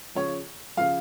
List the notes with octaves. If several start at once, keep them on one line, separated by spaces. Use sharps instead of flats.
C#3 F3 C#5
C#3 F3 F5